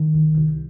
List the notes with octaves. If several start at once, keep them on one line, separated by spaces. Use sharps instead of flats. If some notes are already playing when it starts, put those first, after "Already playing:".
Already playing: D#3
C2
C2